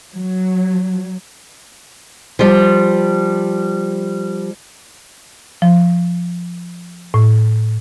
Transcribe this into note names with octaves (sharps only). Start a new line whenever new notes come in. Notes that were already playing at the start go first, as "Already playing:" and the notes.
F#3
F3 G3
F3
A2